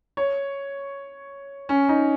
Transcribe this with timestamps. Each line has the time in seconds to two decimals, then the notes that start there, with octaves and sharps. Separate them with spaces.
0.17 C#5
1.69 C#4
1.89 D#4